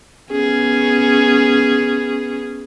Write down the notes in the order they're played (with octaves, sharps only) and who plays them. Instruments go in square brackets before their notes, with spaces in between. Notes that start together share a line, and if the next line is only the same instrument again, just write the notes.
[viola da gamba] B3 C#4 G#4